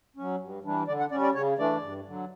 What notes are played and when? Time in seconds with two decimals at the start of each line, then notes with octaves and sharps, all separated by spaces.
0.17 F#3 C#4
0.40 G2
0.64 E3 G3 D4
0.87 D3 D5
1.00 F#5
1.11 G3 C#4 D5
1.23 D5
1.35 C#3 C#5
1.58 E3 A3 D4 D5
1.82 G2
2.06 D3 F#3